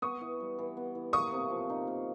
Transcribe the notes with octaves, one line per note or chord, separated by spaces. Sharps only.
B3 C#6 D#6
E3
G3
E3
B3
E3
A#3 C#6 D#6
C3
F3
D#4
A#3